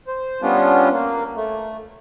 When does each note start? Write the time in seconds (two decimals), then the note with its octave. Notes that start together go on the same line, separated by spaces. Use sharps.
0.07 C5
0.42 G3 B3 C#4 D4 F4
0.93 A#3
1.36 A3